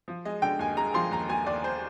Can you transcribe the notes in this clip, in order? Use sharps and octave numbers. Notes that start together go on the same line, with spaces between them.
F3
G#3 D#5
D3 G5
D#2 G#5
G#3 A#5
F3 C6
D#2 A#5
D#2 G#5
D#2 D5
C5